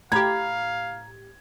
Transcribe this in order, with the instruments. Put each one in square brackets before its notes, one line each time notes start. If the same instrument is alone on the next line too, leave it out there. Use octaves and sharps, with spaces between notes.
[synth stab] A2 G4 [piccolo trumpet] F5 [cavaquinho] A#5 B5 [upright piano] G#6